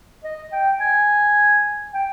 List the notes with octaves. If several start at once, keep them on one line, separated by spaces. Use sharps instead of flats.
D#5
G5
G#5
G5